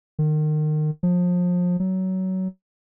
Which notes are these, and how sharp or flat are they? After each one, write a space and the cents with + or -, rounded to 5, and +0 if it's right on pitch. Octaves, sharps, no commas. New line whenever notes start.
D#3 -30
F3 +30
F#3 +20